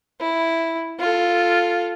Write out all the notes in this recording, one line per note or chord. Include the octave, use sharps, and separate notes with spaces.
E4
F4 A4